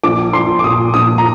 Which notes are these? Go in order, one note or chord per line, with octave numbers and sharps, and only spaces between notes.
A#1 D6
A#1 C6
D6
A#2 D#6
A#1 D#6
A#5